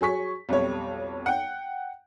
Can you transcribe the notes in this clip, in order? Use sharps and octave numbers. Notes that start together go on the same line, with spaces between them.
F#3 G#4 C#6 B6
B1 F2 G3 C#5
F#5 G5